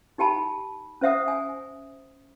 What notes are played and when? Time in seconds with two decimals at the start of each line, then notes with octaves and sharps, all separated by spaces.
0.18 D#4 G4 G5 A5 B5
1.01 C#4 C5 E5 F#5 D#6
1.28 G#5